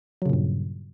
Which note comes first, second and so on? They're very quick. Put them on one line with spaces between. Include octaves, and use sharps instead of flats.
F#3 C#3 A#2 G2